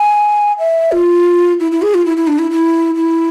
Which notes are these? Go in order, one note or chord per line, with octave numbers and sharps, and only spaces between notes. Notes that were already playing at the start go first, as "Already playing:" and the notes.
Already playing: G#5
E5
F4
E4
E4
G#4
F4
E4
E4
D4
E4
E4
E4